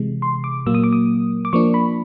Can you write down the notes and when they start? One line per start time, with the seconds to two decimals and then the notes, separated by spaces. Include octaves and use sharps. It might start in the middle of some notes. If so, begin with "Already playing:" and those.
Already playing: C3 E3 G#3
0.22 C6
0.44 D6
0.66 A#2 F#3 A#3 E6
0.74 D#6
0.84 D6
0.93 D#6
1.45 D6
1.53 F3 A#3 D4 C#6
1.74 B5